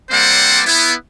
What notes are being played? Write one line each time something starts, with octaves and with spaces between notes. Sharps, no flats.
G3 A#3 C4 C5 D5 F#5
B3 E4